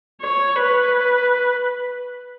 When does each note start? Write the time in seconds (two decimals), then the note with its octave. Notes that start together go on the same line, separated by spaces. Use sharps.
0.22 C#5
0.56 B4